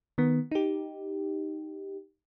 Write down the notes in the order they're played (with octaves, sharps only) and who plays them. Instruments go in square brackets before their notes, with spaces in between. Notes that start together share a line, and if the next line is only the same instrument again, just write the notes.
[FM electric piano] D#3 B3
D#4 G4